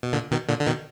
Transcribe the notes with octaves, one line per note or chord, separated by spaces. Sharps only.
B2
A#2 D3
B2 D#3
A#2 D3
D3
B2 D#3